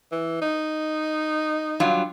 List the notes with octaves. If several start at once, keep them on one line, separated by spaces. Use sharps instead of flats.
E3
D#4
G2 F#3 F4